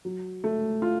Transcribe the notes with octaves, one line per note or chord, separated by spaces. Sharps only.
F#3
A3
F4